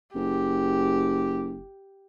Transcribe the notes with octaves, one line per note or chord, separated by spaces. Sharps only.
F#1 G4